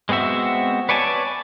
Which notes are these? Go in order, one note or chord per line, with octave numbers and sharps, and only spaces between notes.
G#3 B3 C4 F#4 E5
B4 C#5 D5 G#5 A5